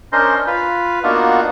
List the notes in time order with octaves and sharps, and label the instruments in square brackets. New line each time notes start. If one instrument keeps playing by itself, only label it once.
[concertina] C#4 D4 A#4 C5 D#5 C6
F4 B4
A#3 B3 D4 D#4 F4 F#4